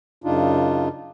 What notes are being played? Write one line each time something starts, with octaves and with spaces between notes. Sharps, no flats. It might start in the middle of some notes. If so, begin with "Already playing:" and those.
F#2 C#3 D4 D#4 F4